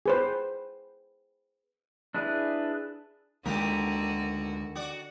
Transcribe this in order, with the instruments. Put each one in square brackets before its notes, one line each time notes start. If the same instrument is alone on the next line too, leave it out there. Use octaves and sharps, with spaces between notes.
[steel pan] G#4 B4 C5
[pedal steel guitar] D4 E4 G#4 B4
[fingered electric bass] D2 G#3 [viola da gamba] D3 F#4 [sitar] D#3 G4 A#4
[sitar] F#4 D5